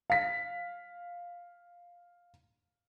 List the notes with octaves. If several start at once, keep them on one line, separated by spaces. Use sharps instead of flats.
F5 B6